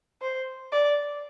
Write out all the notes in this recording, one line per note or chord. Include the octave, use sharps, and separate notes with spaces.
C5
D5